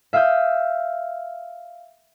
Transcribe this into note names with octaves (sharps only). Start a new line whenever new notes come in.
E5 F5 D#6 E6 G6